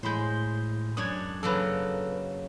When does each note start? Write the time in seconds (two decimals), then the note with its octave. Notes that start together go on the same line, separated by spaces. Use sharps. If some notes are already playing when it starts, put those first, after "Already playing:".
0.03 A2 G#3 C5 B5 G6
0.97 F#2 D4 C#5 D#6 G#6
1.43 C#3 F#3 A#3 A4 B4